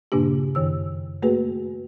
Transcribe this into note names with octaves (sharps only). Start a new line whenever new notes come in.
G2 A#2 C#3 A#3 D4 G4
F#2 D#3 E6
A3 A#3 F#4 G#4 B4